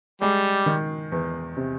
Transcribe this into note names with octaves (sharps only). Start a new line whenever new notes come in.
G3 G#3
D#3
E2
C3